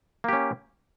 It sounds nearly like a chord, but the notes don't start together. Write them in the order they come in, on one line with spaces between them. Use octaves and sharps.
A#3 G4 C#4